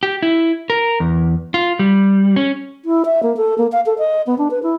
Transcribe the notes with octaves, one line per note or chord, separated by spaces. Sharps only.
G4
E4
A#4
E2
F4
G3
C#4
E4
E5
A#3
A4
A#3
F5
A4
D#5
B3
D4
B4
E4